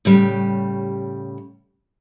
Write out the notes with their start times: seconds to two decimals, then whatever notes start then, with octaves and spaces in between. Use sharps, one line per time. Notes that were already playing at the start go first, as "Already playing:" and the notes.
0.05 A2 C#3 G3